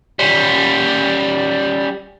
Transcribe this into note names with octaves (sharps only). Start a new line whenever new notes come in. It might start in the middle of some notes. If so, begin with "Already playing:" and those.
G3 C#4